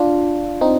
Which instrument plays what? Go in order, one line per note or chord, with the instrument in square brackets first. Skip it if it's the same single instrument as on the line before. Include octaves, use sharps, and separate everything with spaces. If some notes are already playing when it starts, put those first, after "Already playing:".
Already playing: [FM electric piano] D4 F4
C4 D#4